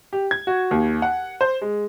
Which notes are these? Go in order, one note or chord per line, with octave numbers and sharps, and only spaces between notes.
G4
G#6
F#4
D#2
F#5
C5
G#3